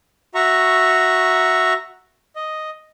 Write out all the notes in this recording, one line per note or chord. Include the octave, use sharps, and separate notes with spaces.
F#4 E5 A#5 C#6
D#5